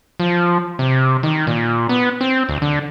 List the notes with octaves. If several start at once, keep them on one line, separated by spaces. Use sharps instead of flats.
F3
C3
D#3
A#2
B3
C4
D2
D3